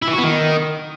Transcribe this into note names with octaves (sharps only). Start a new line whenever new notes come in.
E4
E3
F#4
B3
D#3